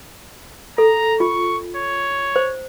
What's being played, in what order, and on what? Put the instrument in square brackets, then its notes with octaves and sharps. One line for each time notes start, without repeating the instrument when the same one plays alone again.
[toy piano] A4 [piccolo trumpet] A#5
[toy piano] F4 [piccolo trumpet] C#6
[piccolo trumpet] C#5
[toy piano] C5